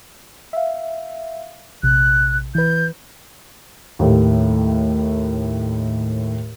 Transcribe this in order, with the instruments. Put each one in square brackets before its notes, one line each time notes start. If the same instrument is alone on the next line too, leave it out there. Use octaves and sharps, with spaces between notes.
[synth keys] E5 F5
[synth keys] A#1 C3 [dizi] F#6
[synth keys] E3 B4 [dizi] G6
[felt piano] D#2 A2